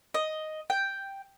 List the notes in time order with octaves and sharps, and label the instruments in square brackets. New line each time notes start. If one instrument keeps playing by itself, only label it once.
[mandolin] D#5
G5